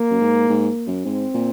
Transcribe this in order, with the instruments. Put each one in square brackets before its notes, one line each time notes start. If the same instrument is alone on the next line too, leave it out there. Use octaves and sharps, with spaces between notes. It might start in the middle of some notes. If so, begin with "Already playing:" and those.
Already playing: [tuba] A#3
[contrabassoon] F#2
G#2
G#2
F#2
[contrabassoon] G#2 [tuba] C4
[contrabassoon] A#2